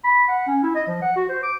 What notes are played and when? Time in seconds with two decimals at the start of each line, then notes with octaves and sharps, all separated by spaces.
0.04 B5
0.28 F#5
0.47 C#4
0.63 E4
0.75 D#5
0.87 F3
1.02 F#5
1.16 F#4
1.29 C5
1.43 D6